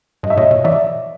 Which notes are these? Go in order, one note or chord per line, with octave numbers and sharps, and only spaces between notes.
G2 D#5
E5
A#2 C#5 D#5
B2
E3 D5 E5